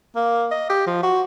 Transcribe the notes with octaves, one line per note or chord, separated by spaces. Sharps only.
A#3
D#5
G4
F3
F#4